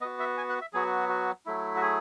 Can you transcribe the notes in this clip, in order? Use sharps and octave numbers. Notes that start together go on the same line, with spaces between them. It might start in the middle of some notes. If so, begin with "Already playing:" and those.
B3 F#4 D#5
E5
G#5
F#5
E5
F#3 B3 F#4 G#4
F#4
F#3 A3 E4
F#4
G#4